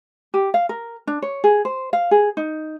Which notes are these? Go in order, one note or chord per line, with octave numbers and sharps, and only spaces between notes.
G4
F5
A#4
D4
C#5
G#4
C5
F5
G#4
D#4